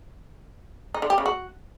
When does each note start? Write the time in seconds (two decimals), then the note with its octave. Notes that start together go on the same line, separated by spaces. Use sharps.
0.94 D#4
1.02 D3
1.10 G4
1.18 C#3
1.26 F#4